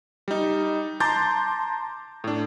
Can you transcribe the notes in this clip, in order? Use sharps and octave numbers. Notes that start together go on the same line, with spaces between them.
G3 D#4
A5 A#5 C6 D6 G6 A6
A2 D4